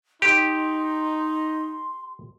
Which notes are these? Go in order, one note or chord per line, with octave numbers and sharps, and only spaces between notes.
D#4 G4 C6